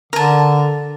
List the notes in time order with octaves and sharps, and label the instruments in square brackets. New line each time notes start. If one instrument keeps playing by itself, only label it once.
[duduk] D3 [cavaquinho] A#4 A5